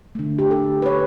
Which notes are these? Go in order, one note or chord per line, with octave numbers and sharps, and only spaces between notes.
D3 A3
G4
A4
B4
C#5